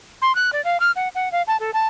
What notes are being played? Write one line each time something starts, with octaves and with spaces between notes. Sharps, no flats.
C6
F#6
D5
F5
F6
F#5
F#5
F5
A5
A4
A5